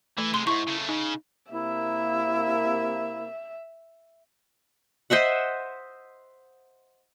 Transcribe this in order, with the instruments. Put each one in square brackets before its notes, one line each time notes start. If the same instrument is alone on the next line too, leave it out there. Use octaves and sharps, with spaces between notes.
[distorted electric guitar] E3 [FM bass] A3
[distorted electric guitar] C3 G#3 [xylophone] C6
[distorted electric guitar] F2 G#2 [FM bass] E4 [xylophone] C#6
[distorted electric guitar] C#3 A3
[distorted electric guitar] C#3 [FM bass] D#4
[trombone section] C3 A#3 [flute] E4 [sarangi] E5
[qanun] C5 D#5 E5 F#5